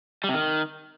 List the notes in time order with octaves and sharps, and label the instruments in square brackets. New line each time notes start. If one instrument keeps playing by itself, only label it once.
[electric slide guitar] G3
C3
D#3